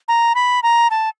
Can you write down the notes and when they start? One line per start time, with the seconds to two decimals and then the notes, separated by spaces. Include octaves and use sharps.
0.08 A#5
0.35 B5
0.63 A#5
0.91 A5